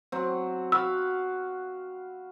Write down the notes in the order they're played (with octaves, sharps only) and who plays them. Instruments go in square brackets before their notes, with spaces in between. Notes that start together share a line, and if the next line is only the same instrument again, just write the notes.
[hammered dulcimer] F#3 C4
[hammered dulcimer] F#4 F5 B5 [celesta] E6